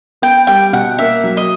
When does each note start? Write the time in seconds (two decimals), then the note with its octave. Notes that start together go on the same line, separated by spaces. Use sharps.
0.22 B3 G5
0.47 G3 G5
0.73 B2 F#5
0.99 A#3 E5
1.24 F#3
1.37 D#5